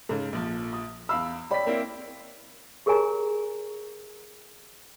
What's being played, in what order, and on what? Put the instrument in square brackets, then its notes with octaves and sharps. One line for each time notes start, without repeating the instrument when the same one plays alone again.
[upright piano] G#2 C#3 [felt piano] A4
[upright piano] A#1 F3
[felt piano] D#6
[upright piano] E2 F5 B5 [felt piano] E6
[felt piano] C#5 D5 G5 [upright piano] B5 B6
[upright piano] A#3 C4 E4
[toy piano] G4 G#4 A#4 C#5 G#5 A#5